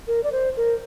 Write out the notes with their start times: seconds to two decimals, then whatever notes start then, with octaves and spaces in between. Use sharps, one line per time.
0.07 A#4
0.23 D5
0.32 C5
0.56 A#4